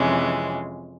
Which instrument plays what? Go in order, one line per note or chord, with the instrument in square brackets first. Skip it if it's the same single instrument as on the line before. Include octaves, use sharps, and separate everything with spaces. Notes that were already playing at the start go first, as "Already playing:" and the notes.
Already playing: [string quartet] F2 C3 E3 G#3 C#4